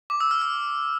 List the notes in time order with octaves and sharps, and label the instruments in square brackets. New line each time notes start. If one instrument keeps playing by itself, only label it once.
[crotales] D6
E6
F6
F6